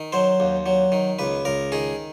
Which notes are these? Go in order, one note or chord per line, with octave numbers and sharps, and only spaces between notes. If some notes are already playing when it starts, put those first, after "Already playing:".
Already playing: D#3
F#3 C5
D#2
F#3
D#3
C#2 B4
C#2 A#4
D#3 G#4